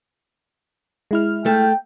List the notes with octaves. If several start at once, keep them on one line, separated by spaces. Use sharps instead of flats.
G#3 E4 F6
A3 G5